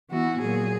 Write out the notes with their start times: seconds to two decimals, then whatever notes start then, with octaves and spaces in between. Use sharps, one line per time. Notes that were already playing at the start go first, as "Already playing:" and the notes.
0.10 E3 B3 E4 F#4
0.40 A#2 F#3 A#3 G#4